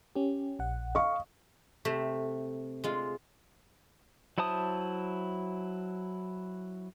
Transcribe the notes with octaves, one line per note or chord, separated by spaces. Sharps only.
C#4 G4
A#1 F#5
D#5 F5 C#6
C3 A3
G#3 F4
F#3 E4 C5 A5 D#6